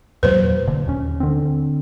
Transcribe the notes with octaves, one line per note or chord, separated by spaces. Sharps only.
E2 A#2 F#3 B4 C5
E1 A#2 D3
D#2 C#4
D3 C4